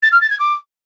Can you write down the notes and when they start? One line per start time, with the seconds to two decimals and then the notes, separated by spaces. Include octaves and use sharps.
0.02 A6
0.12 F6
0.21 A6
0.30 G#6
0.39 D6